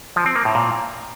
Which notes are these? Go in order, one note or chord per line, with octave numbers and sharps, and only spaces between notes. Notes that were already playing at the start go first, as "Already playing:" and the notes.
F3
C4
A#3
A2
A#2